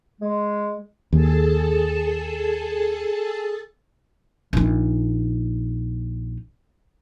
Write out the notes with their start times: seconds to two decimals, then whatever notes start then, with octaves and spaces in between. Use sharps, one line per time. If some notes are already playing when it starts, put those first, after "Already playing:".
0.21 G#3
1.13 D#2 G#4 A4 A5
4.53 A#1 D#4